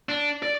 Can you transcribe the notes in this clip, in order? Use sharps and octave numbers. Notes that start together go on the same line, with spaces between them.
D4
D5